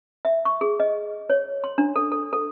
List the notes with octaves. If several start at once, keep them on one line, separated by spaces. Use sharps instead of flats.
E5
C#6
G#4
D#5
C#5
C6
D4
A4
A4
A4